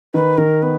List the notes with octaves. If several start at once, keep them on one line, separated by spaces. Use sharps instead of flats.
D#3 B4
D#3 A#4
B3 B4